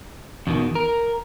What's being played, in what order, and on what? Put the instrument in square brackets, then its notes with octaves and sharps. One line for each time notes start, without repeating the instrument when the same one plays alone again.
[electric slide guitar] E2 B2 D#3
A#4